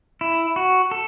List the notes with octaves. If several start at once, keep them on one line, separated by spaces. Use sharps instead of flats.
E4
F#4
A4